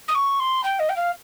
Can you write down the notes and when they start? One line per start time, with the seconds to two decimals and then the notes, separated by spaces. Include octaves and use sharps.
0.08 D#6
0.14 C#6
0.39 C6
0.63 G5
0.79 D#5
0.89 G5
0.96 F5